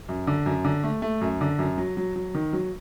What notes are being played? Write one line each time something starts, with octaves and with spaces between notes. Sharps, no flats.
F#2
D3
F#2
D3
A3
A3
F#2
D3
F#2
F#3
F#3
F#3
D#3
F#3